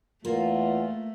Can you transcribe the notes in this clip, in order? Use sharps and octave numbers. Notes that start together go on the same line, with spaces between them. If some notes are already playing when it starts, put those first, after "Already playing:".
E2 A3 A#3 F4